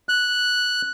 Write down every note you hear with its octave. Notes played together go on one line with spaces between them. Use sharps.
F#6